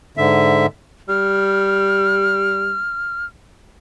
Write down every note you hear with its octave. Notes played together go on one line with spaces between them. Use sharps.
G#2 D3 E5
G3 F6